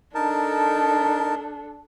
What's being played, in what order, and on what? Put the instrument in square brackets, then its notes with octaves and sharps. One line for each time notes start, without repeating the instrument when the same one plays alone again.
[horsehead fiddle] D4 A4 [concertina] D#4 A#4 A5